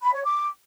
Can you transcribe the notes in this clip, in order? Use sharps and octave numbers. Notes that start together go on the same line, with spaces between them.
B5
C#5
D6